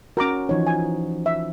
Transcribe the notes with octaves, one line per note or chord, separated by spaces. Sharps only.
C#4 F#4 A#4 A#5 D6
E3 F3 D#4 C#5
G#5
E5